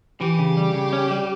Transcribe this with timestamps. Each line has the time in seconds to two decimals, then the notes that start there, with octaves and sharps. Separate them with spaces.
0.21 E3 G4
0.39 C#3
0.57 G3
0.74 C#3
0.93 C#4
1.11 G3